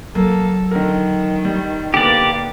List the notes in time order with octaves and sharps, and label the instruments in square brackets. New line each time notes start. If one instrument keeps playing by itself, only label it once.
[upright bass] F#3 [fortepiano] A#3 [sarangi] A4
[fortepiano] D3 A#4 [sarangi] D#3
[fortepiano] G3
[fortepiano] D3 B3 [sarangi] A#3 [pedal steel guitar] G4 D5